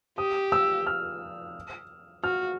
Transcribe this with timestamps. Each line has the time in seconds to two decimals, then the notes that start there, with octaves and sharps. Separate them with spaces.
0.18 G4 D#6
0.52 E6
0.87 F6
2.24 F#4 F6